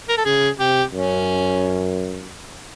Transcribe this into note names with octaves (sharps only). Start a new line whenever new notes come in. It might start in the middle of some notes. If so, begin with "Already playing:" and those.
A#4
A4
C#3 G#4
C3 G4
F#2 C#4